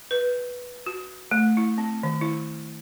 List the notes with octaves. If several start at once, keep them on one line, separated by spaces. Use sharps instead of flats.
B4
F#4
A3
E4
C4
D#3
E4